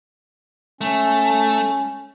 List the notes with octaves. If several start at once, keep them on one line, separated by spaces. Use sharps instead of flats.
A3 C#4